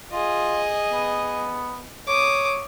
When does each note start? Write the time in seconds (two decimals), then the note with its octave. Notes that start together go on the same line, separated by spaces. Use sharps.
0.13 F4 G#4 D#5
0.91 B3
2.08 C#5 D6 D#6